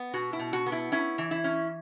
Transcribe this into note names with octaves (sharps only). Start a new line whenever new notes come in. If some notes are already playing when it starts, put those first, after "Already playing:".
Already playing: B3
B2 F#4
E4
B2
F#4
B3
E4
C#4 E4
E3
E4
C#4